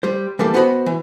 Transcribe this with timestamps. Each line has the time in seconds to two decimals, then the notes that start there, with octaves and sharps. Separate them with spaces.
0.03 G3 C5
0.39 E3 G3 A#3 G4 A4
0.54 B3 F#4 C5 D#5 G#5 B5
0.86 E3